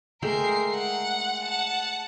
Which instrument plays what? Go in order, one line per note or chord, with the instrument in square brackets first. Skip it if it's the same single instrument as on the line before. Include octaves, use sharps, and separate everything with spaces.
[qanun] G#3 A3 G5 [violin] A#4 C7
[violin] F#5
F#5 A5